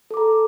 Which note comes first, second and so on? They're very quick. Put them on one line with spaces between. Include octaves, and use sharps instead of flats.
A4 D6 A#5